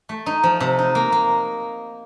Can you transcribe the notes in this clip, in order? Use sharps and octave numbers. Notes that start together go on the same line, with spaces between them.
A3
D#4
F3
C3
D#4
A#3
A#3